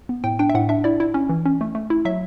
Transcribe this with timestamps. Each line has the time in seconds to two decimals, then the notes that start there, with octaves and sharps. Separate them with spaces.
0.09 B3
0.24 A2 G5
0.39 D4 G5
0.50 E5
0.55 A2 F#5
0.69 D4 E5
0.84 E4 D5
1.00 E4
1.14 C#4
1.29 E3
1.46 C#4
1.61 A3
1.75 A3
1.90 E4
2.05 F#3 E5